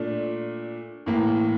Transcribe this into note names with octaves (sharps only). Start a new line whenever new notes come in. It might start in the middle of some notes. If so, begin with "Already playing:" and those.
Already playing: A#2 A3 D4
A2 E3 A#3